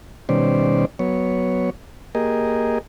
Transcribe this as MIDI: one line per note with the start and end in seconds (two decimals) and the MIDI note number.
0.29 0.85 47
0.29 0.85 51
0.29 0.85 55
0.29 0.85 61
0.29 0.85 72
0.29 0.85 74
0.99 1.70 54
0.99 1.70 59
0.99 1.70 73
2.15 2.78 58
2.15 2.78 67
2.15 2.78 68
2.15 2.78 70
2.15 2.78 75